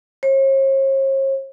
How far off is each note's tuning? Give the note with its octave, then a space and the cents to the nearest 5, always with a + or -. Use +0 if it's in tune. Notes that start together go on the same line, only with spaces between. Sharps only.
C#5 -45